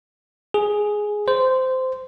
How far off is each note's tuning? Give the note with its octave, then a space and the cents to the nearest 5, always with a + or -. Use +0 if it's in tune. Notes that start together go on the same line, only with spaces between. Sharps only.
G#4 +5
C5 -15